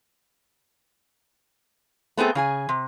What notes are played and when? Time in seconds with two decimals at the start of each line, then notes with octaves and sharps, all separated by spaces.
2.17 A3 B3 C4 G#4 A4
2.35 C#3 G#4 G#5
2.69 C3